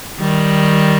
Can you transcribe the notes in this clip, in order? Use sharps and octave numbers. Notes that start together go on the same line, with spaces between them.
D#3 G3